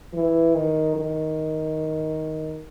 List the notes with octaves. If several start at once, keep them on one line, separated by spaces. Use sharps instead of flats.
E3
D#3
D#3